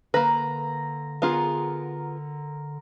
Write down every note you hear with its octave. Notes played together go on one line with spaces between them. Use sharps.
D3 A#3 B4 A#5
B3 F4 G#4 A#4